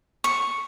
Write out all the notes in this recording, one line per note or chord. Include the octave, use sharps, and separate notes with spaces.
C#6